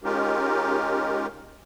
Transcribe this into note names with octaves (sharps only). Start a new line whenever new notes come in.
G#3 C#4 D#4 F4 G4 A#4